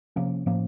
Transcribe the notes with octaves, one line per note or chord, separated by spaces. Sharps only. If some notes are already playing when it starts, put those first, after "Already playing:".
C3 F3 A#3 C#4
A2 F3 A#3 C#4